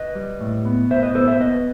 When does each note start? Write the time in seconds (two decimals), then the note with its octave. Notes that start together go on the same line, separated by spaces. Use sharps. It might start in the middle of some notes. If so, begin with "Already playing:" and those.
Already playing: B4 D#5
0.15 G3
0.41 A2
0.65 B3
0.90 A2 C5 E5
1.03 B4 D#5
1.15 B3 A4 C5
1.28 C5 E5
1.40 B3 B4 D#5